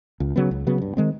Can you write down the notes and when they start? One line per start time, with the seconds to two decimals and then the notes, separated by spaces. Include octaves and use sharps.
0.20 C#2
0.36 C#3 F#3 B3
0.51 C#2
0.67 C#3 F#3 B3
0.82 G2
0.97 D#3 G#3 C4